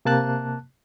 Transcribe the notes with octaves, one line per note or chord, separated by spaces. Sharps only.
C3 A#3 A5 F#6